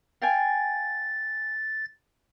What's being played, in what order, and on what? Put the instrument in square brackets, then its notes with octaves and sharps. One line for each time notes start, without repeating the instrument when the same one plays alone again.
[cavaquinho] F5 G5 G#5 [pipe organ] A6